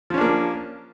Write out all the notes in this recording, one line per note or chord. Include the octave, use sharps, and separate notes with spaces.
F3 A#3 C#4 D4